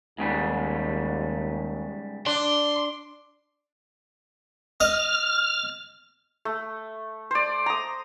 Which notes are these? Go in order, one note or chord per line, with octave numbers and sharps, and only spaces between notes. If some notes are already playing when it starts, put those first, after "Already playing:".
D#2 G#2 C#3 G3
D4 C6
D#5 F6
A3
C5 D5
A#5 D#6